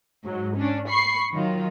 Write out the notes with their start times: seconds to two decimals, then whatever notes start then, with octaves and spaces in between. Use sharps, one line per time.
0.24 G#2 F#3
0.56 C#4 D4
0.88 B5 C#6 C7
1.34 D#3 F#3 F4